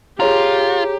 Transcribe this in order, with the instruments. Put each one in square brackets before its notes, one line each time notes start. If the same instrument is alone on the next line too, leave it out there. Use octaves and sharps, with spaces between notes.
[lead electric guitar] F4 [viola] G4 [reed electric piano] G#4 C#5 A#5